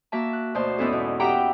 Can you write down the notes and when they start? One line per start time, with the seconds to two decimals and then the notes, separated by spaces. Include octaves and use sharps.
0.12 A#3 F#4 E5 A5
0.33 F#6
0.54 D2 B2 C5 A5
0.78 E2 G#2 B3 C#4 E4 A4
0.93 B2
1.20 G4 E5 F#5 G5 A#5